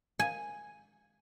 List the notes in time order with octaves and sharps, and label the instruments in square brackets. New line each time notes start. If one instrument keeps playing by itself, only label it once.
[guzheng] G#5